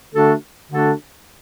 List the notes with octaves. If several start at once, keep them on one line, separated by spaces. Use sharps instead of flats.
D3 A3 D4 F#4 A4
D3 A3 D4 F#4 A4